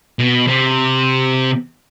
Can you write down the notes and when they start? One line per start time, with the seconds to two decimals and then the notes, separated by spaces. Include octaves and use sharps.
0.19 B2
0.47 C3